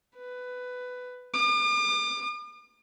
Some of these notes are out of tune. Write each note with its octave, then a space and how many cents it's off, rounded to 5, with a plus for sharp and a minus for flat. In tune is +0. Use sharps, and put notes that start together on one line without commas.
B4 +15
D6 +40